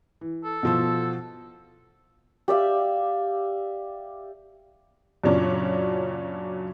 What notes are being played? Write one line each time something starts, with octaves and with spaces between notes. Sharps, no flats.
E3
A4
B2 F3 E6
G4 D5 E5 F5
F#2 A#2 C#3 F#3 C#4 D4